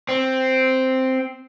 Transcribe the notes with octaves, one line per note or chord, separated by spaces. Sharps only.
C4